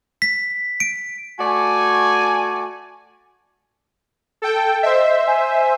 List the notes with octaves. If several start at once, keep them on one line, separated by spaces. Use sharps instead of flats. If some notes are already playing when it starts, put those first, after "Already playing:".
B6
D7
A3 F#4 D5 G#5
A4 G5
C5 D#5 E5
G#5